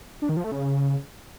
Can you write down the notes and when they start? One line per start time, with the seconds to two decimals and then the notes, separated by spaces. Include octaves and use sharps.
0.22 D4
0.29 D#3
0.37 F3
0.44 A3
0.52 C#3